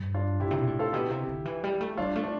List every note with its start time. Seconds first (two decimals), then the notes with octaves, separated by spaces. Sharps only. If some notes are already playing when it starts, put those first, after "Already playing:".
Already playing: G2
0.14 D4 F4
0.40 A2 E4 G4
0.51 C3 E4
0.59 B2
0.67 A2
0.79 F4 A4
0.92 B2 E4 G4
1.10 C3
1.28 D3
1.45 E3
1.64 G3
1.81 A3
1.97 G3 D4 F4
2.15 A3
2.24 D4